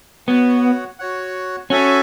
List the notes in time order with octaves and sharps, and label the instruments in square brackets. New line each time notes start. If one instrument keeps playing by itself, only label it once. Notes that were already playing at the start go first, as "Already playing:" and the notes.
[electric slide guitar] B3 [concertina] F#4 C#5 F#5
[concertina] F#4 C#5 F#5
[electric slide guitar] C#4 [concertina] F#4 A4 E5 G#5